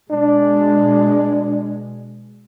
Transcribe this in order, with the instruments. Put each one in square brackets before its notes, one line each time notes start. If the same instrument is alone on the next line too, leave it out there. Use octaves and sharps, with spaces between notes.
[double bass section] B2 G#3 [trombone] D4